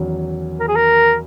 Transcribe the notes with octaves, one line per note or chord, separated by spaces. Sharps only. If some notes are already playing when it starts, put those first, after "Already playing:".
Already playing: E2 D#3 F#3 C#4
A#4
G#4
A#4